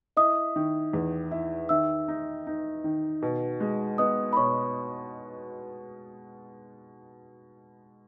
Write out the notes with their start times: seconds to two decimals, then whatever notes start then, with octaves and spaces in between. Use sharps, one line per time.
0.17 E4 D#5 D#6
0.56 D#3
0.93 E2
1.31 E4
1.69 D#3 E5 E6
2.08 D#4
2.47 D#4
2.84 D#3
3.22 B2
3.60 G#3
3.98 B3 D#5 D#6
4.33 B5
4.37 B2 C#5 C#6